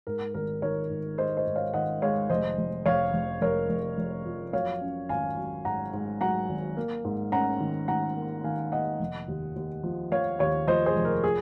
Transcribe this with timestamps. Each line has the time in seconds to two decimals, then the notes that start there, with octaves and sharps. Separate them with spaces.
0.07 G#2 A#4
0.34 G#1 A#4
0.62 D#3 A#4 C#5
0.90 G#2
1.18 G#3 C5 D#5
1.37 C5 D#5
1.46 G#2
1.56 C#5 F5
1.74 D#3 D#5 F#5
2.02 G#3 C#5 F5
2.29 F1 C5 D#5
2.58 F1
2.86 F1 C#5 F5
3.14 F1
3.41 F1 A#4 C#5
3.70 F1
3.98 F1
4.26 F2
4.53 F#3 C#5 F5
4.81 C#4
5.09 G#1 F5 G#5
5.37 F#3
5.65 G#2 F#5 A#5
5.93 G#2
6.21 F#3 F#5 A#5
6.49 G#1
6.77 A#3
7.04 G#2
7.32 C#4 F#5 A#5
7.60 D#3
7.88 D#3 F#5 A#5
8.16 A#3
8.44 D#3 F5 G#5
8.72 A#3 D#5 F#5
9.00 F1
9.28 D#2
9.56 D#2
9.84 F3
10.12 F3 C#5 F5
10.39 D#2 C#5 F5
10.67 F3 C5 D#5
10.86 G#4 C5
10.96 F1
11.05 A#4
11.24 G#4